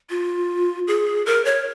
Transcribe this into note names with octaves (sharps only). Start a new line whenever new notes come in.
F4
G#4
A#4
C#5